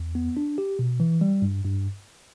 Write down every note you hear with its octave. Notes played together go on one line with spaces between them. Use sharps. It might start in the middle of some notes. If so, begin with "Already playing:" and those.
Already playing: E2
B3
D4
G4
B2
E3
G3
G2
G2